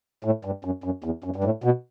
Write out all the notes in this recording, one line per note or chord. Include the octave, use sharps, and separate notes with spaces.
A2
G2
F#2
F#2
E2
F#2
G2
A2
B2